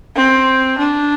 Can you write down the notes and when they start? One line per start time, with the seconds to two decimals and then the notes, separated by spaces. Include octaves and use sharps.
0.16 C4
0.78 D4